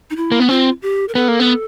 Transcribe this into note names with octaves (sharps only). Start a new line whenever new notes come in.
D#4
E4
A#3
B3
C4 F4
G4
A#4
B3 A4
A#3
B3